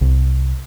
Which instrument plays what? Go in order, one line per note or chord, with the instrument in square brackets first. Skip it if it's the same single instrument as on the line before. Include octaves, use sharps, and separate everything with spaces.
[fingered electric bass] C2